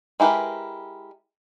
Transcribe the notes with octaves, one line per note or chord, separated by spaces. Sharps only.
G#3 E4 G4 A#4 B4